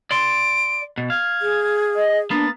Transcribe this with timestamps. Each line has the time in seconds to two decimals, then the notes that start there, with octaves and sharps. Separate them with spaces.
0.11 D5 C6 D7
0.98 B2
1.10 F5 G#6
1.42 G#4
1.96 D#5
2.31 A#3 B3 D4 A6